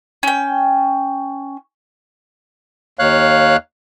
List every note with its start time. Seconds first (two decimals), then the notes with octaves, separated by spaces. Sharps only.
0.23 C#4 G5
2.99 D#2 C#5 F5 F#6